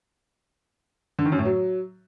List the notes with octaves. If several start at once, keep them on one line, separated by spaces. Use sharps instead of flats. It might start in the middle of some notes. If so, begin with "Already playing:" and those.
D3
D#3
F#2
A2
F#3